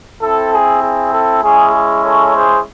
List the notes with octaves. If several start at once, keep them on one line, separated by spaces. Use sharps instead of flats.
C4 E4 A4
G#4
G#4
A4
G#3 C#4 E4 G#4
G#4
A4 C#5
G#4 C5